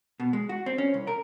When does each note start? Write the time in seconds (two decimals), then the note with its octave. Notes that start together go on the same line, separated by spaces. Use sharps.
0.20 B2
0.33 G#3
0.49 F#4
0.66 C4
0.78 C#4
0.94 C2
1.07 A#4